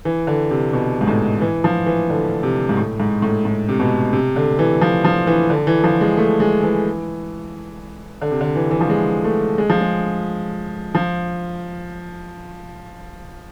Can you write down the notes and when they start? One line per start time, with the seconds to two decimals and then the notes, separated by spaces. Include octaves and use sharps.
0.05 E3
0.27 D3
0.51 C3
0.73 B2
1.01 G#2
1.08 A2
1.41 E3
1.64 F3
1.86 E3
2.10 D3
2.43 C3
2.69 G#2
2.77 A2
3.00 G#2
3.22 A2
3.45 A2
3.69 C3
3.80 B2
4.13 C3
4.36 D3
4.59 E3
4.81 F3
5.04 F3
5.27 E3
5.50 D3
5.67 E3
5.84 F3
6.01 G#3
6.17 A3
6.40 G#3
6.63 E3
8.22 D3
8.31 C3
8.41 D3
8.56 E3
8.71 E3
8.81 F3
8.90 G#3
9.24 A3
9.58 G#3
9.70 F3
9.81 G#3
10.95 F3